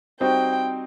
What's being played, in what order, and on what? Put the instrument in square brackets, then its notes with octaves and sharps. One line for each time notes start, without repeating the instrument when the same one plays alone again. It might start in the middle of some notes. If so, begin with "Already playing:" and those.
[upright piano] G3 C4 D#4 F#4 C5 [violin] G5